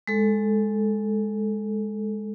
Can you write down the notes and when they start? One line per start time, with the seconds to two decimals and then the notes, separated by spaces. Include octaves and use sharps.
0.07 G#3 A4